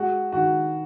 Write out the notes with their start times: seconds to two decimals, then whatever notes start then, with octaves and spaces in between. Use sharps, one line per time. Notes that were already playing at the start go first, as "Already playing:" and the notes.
Already playing: G#3 F#4
0.32 D#3 F#4